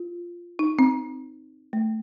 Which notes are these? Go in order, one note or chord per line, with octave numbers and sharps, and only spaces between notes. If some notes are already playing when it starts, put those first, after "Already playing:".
Already playing: F4
D#4
C4
A3